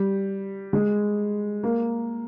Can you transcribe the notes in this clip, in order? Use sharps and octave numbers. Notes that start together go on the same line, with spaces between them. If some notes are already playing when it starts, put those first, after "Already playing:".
Already playing: G3
G#3
A#3